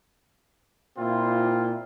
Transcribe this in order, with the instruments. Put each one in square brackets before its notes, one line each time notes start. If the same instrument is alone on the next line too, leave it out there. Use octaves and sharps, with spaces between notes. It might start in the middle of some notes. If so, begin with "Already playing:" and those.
[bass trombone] A#2 [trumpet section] C4 E4 F4